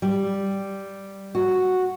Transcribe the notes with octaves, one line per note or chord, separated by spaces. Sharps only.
G3
F#4